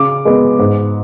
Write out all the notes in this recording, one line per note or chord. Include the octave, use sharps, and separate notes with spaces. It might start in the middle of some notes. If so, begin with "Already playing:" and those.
Already playing: C#3 D6
G#3 B3
G#2